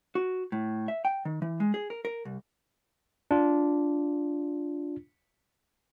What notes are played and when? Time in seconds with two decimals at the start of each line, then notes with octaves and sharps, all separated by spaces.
0.15 F#4
0.52 A2
0.88 E5
1.05 G5
1.25 D#3
1.42 E3
1.60 G#3
1.74 G#4
1.90 A#4
2.05 A#4
2.25 C2
3.31 D4 F4